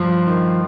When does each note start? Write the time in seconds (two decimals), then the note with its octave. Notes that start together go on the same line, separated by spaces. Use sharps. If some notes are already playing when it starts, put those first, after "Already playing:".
Already playing: G2 F3 F4
0.27 D#3